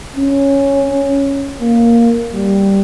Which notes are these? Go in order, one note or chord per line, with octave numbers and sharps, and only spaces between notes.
C#4
A#3
G3